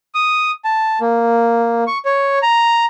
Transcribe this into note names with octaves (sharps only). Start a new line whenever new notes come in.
D#6
A5
A#3
C#6
C#5
A#5